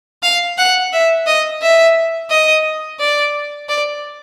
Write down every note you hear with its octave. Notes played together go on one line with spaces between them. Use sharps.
F5
F#5
E5
D#5
E5
D#5
D5
D5